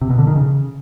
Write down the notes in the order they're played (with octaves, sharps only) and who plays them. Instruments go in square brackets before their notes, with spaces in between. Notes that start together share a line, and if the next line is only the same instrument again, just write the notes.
[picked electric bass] C3
B2
D3
D#3
C#3